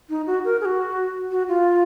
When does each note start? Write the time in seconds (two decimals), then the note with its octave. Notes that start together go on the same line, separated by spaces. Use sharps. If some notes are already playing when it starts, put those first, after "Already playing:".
0.10 D#4
0.27 F#4
0.45 A#4
0.61 G#4
0.65 F#4
1.31 F#4
1.48 F4